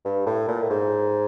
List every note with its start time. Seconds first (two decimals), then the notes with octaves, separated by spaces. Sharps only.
0.05 G2
0.26 A2
0.48 A#2
0.62 A2
0.69 G#2